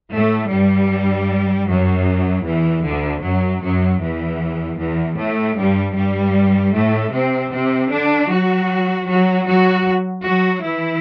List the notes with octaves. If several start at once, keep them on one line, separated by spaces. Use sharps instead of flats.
A2 A3
G2 G3
F#2 F#3
E2 E3
D2 D3
F#2 F#3
F#2 F#3
E2 E3
E2 E3
A2 A3
G2 G3
G2 G3
A2 A3
C3 C4
C3 C4
D3 D4
F#3 F#4
F#3 F#4
F#3 F#4
F#3 F#4
E3 E4